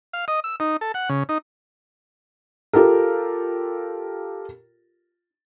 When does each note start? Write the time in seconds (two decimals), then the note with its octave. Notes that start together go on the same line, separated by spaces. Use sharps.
0.13 F5
0.28 D#5
0.44 E6
0.60 D#4
0.81 A4
0.94 F#5
1.09 C#3
1.29 D#4
2.73 F4 G4 A4 A#4